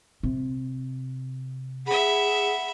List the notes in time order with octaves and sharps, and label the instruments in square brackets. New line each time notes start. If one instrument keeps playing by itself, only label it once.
[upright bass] C3
[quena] G#4 [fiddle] E5 B5 [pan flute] F#5